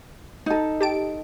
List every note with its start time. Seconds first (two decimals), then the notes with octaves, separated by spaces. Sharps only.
0.46 D#4 A4
0.81 G4 A5 D7